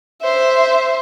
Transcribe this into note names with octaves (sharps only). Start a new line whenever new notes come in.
C5 E5